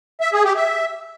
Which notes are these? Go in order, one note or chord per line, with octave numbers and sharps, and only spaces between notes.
E5
G#4
G4
E5